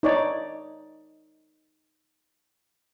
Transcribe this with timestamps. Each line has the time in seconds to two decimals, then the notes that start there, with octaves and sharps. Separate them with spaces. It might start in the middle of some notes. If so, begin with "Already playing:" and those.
0.03 D#4 C#5 D5